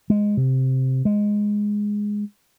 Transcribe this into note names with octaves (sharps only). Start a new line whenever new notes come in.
G#3
C3
G#3